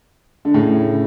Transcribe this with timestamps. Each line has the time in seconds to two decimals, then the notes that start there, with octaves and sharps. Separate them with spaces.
0.45 D3
0.54 A2 C#3